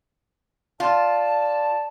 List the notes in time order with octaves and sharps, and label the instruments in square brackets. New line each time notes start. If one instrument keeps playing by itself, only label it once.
[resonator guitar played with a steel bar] F4 [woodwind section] D5 A5